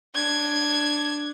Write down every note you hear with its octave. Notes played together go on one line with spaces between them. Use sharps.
D4 G#6